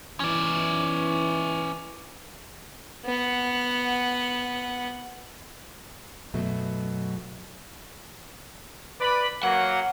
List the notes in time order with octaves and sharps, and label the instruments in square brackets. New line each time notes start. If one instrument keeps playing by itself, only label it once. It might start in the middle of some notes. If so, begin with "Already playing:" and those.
[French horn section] E3 [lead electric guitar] C#4 D5
[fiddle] B3 F#5
[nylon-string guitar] F#2 B2 F#3 A3
[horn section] B4 D5 B5
[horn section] F#3 A#3 [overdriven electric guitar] F#5